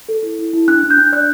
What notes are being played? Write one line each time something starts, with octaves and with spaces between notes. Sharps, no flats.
A4
E4
E4
E4
D4 F#6
D4
G6
D4
D5 F#6